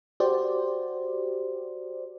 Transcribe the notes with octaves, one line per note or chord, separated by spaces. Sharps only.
F#4 G4 C5 D5